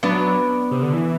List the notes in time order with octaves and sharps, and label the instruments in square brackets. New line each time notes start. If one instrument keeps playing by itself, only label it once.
[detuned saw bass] F#3 [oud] B3 D4
[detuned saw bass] C3
D3
E3